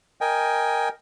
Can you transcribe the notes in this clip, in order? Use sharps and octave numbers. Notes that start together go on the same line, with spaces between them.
A#4 D#5 G5 G#5